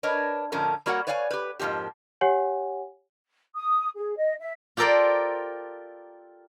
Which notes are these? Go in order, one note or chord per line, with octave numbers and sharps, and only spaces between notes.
D4 A#4 B4 C#5 D#5
F2 A2 D3 F3 C#4 A#4
G3 A#3 F#4 A#4 C#5 F#5
B4 C#5 D5 F5 G5 G#5
G4 B4
F2 G#2 F3 A#3 G4
G4 C#5 F#5 G#5
D#6
G#4
D#5
E5
F4 G4 A4 A#4 C5 D5